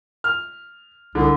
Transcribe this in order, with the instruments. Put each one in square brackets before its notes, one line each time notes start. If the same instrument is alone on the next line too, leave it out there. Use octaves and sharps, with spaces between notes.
[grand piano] F6
[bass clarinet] C2 [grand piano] D3